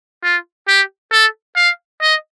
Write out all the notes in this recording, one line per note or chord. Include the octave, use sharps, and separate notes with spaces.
F4
G4
A4
F5
D#5